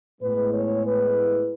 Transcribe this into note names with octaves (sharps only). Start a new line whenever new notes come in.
A2 G#3 B3 B4
C#5
B4